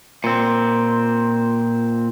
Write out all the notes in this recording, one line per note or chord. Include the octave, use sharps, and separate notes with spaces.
A#2 C4